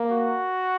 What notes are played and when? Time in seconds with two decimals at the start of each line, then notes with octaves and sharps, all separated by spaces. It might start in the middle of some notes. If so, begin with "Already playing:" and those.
Already playing: A#3
0.12 F#4